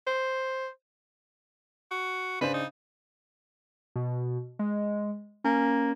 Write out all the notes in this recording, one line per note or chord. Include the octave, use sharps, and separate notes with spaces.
C5
F#4
C#3 D4 B4 C5
D#4
B2
G#3
A#3 C#4